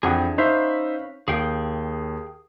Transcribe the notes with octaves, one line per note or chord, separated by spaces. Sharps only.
F2 E3 D4 G#4 F#5 G5
C#4 D#4 B4 C5 E5 F5
D#2 G#4 F5 G5